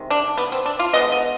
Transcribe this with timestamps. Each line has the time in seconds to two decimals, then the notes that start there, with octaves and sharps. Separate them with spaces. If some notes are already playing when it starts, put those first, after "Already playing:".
Already playing: C3 D#3 G#3
0.10 D4
0.37 B3
0.52 C4
0.66 D4
0.79 F4
0.93 D3 G#3 B3 D#5
1.12 D#5